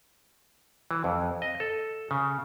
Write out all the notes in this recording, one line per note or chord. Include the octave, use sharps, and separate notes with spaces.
E3
F2
D#5
A4
C#3